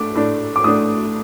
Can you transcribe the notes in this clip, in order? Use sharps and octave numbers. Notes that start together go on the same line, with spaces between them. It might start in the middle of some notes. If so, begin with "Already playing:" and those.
Already playing: A2 A3 D4 D6
A2 A3 D4
D6
A2 A3 D4 D#6